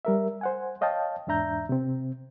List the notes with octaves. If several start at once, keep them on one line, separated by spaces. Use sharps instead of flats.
G3 A#4 E5
C5 F#5 G#5
C#5 D#5 F5 G5 A5
E2 G#2 D4 E5 A#5 G6
C3 C4